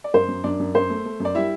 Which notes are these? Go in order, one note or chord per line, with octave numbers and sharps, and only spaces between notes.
D5
F#2 C5
F#2
F#2 D4 D5
F#2
F#2 C5
A3
A3
F#2 D5
G3 E4 E5